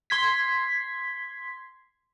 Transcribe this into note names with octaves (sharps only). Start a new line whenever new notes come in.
C6 G#6 B6